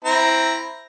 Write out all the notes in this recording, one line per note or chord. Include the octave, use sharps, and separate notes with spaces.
C4 E4 A#5